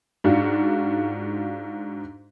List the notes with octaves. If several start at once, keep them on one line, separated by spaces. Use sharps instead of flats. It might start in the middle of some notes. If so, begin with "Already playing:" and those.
G#2 D4 F4 F#4